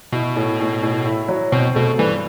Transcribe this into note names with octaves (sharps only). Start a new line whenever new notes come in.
B2 E4
A2
A2
A2
E4
F#3
B2 C4
B2 A3
G2 E3